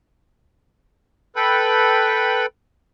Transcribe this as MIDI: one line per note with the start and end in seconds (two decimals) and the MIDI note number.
1.36 2.46 69
1.36 2.46 71
1.36 2.46 79
1.36 2.46 83